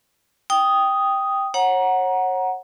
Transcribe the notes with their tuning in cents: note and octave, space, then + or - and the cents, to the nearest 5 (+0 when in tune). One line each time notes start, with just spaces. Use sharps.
G5 +0 D#6 +0
C#5 -30 F#5 +0 A#5 +15